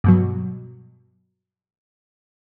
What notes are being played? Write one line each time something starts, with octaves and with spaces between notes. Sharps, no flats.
G2 B2 F#3